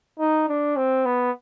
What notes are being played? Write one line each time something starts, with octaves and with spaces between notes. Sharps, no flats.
D#4
D4
C4
B3